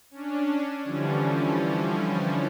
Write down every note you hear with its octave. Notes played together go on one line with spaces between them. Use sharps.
C#4 D4
D3 E3 F3 G3 C#4